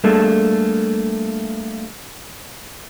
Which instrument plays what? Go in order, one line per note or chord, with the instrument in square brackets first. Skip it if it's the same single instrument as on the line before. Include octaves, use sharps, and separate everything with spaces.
[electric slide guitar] G3 A3 A#3 D4 G#4 A4